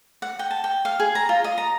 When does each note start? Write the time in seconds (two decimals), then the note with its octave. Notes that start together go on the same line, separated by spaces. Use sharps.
0.22 F#5
0.39 G5
0.51 A5
0.64 G5
0.85 F5
1.00 G#4
1.15 A#5
1.29 F4
1.44 D#5
1.58 A#5